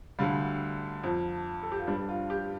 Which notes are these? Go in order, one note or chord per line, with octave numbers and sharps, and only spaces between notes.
D2 D3 G3 F5
F2 F3
A4
G4
F4
G2 G3 D4
F4
G4